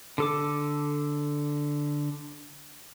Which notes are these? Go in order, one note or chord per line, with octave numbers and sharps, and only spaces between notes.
D3 A4 D6